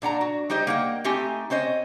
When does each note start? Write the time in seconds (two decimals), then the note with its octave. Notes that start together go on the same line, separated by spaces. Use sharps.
0.02 A#2 D4 F#5 A#5
0.21 F#4
0.50 G3 D#4 G4 C5 D#5
0.67 A#3 F#5 G5
1.04 A3 C4 D#4 G4 G#5
1.50 C4 C#4 C5 D#5